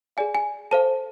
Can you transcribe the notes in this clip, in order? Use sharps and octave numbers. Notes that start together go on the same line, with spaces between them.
G#4 D5 F5 G#5
G#5
A4 C5 F5 A5